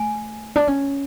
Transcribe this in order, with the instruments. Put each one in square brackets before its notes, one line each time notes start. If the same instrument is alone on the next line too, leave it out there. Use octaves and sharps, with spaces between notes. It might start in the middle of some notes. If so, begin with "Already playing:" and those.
Already playing: [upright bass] A3 [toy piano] G#5
[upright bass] D4
C#4